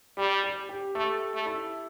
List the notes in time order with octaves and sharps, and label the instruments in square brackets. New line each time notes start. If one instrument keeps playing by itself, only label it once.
[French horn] G3 [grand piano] G4
[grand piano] G4
G4
[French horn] A3 [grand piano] A4
[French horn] A3
[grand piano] E4